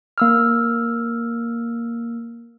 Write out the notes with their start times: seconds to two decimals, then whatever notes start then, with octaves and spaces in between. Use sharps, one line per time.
0.18 A#3 E6 F6